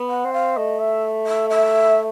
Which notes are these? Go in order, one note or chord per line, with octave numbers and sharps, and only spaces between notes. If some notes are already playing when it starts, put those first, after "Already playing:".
Already playing: B3
F#5
C4
F5
A3 D#5
E5
E5
E5